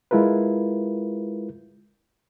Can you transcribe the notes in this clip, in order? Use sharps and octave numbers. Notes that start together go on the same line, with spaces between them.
G#3 E4 F4 A#4 B4